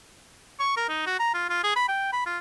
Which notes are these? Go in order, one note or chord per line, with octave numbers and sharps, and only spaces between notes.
C#6
A#4
D#4
F#4
A#5
F4
F4
G#4
B5
G5
B5
F4